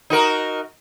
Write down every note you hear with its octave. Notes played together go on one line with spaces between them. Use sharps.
D#4 F#4 A#4